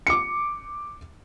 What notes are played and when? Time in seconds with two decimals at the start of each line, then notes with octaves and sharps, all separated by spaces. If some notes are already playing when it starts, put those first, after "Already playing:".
0.07 D6 C#7